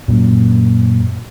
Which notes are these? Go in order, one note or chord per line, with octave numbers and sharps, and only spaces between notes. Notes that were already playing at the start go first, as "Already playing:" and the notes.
F#2 A#2 A#3